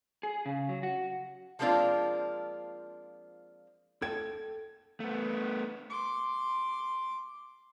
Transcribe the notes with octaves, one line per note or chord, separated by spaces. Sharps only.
G#4
C#3
F#3
F#4
F3 G#3 A#3 C4 D4 F4
A4 G5 G#6
A3 B3
C6 D6